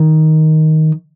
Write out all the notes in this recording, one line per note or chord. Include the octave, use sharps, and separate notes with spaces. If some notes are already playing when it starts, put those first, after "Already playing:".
Already playing: D#3